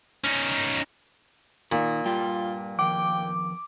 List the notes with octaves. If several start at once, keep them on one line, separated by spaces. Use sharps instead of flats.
C#4 D#4
A#2 D#3
G2 G3 F4 G5
F2 D#3 G5 D6